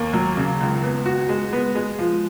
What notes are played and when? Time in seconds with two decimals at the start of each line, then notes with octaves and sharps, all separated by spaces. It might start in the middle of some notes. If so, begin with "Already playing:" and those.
Already playing: D#2 A#3
0.14 F#3
0.37 C#3
0.61 C#2
0.83 B3
1.06 F#4
1.29 G#3
1.53 B3
1.75 G#3
1.99 F3